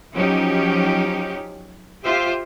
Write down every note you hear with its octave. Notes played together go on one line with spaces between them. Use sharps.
F3 F#3 C#4 D#4 G4
F4 G4 C5 E5